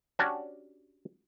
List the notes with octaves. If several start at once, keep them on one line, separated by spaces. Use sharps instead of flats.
C#4 D4 F#4 G4 D5